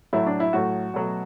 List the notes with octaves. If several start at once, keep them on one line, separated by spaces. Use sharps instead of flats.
A2 F#3 A3 E4
D4
E4
A2 F#3 A3 F#4
B2 F#3 A3